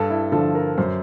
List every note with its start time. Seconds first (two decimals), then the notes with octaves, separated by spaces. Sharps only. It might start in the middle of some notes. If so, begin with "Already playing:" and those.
Already playing: G2 A4
0.10 E4
0.32 D3 F3 A4
0.55 A#4
0.78 F#2 C5